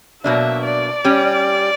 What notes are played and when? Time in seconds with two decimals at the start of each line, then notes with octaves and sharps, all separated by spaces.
0.24 B2 F#3 A#3 D4 E5
0.64 D5
1.05 G3 C#4 G4